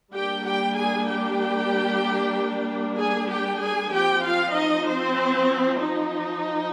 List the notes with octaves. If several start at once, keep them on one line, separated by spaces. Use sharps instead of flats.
G3 A#3 D4 G4 G5
G4 G5
G#4 G#5
G4 G5
G#4 G#5
G4 G5
G#4 G#5
F3 C4 G4 G5
F4 F5
D#4 D#5
C4 C5
D#4